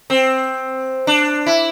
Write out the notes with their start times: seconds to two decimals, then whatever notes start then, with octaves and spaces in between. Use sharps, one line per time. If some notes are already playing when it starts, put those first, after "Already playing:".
0.10 C4
1.07 D4
1.46 E4